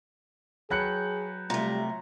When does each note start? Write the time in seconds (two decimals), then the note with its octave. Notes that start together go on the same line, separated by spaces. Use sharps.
0.70 F#3 G#4 B4 G5 A5 F#6 C#7
1.50 C3 G3 A3 F4 A#5